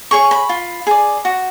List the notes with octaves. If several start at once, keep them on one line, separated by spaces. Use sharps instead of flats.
G#4 C#5 C#6
B5
F4
G#4 D5
F#4